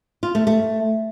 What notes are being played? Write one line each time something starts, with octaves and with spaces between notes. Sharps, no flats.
F4
A3
A3